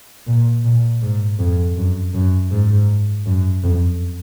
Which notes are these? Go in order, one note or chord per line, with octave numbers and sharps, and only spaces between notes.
A#2
A#2
G#2
F2
F#2
F#2
G#2
F#2
F2